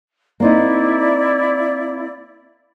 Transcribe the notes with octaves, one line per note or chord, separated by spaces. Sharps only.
A#3 C4 D#4 E4 D5